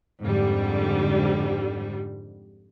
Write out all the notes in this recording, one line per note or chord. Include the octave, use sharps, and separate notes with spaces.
F2 G#2 D3 G3